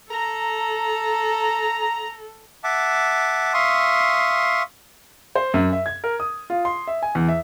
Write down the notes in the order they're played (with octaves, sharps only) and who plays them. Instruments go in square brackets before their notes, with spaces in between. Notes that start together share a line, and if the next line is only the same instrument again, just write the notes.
[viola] A4 [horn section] A#5
[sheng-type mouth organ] E5 F#5 A5 D6
E5 F5 C6 C#6 D#6
[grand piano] C5
F#2
E5
G#6
A#4
D#6
F4
C6
E5
G#5
E2
E5